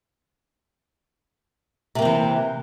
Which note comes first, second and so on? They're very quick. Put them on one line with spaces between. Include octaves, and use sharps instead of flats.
C3 A#3 C4 E3